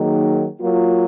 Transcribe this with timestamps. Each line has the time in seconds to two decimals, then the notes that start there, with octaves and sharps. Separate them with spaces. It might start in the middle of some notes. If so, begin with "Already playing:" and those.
Already playing: D#3 F#3 A#3 D#4 G#4
0.59 F#3 A#3 F4